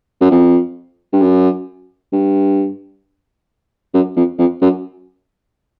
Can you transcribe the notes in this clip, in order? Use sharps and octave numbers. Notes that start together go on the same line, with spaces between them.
F#2
F2
G2
F#2
G2
F#2
F2
F2
F#2